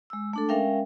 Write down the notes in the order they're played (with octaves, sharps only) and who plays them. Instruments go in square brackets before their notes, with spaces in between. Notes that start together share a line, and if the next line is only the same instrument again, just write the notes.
[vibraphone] G#3 E6
A3 D4 A4
G#3 C#4 A#4 E5 F5 G5